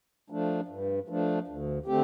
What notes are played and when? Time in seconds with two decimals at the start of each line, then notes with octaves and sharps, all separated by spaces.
0.30 F3 A3 D4
0.68 G2
1.08 F3 A3 D4
1.47 D2
1.86 D3 A3 C4 G4